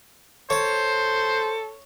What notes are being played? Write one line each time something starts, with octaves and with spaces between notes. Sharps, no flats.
A4 C5 C#5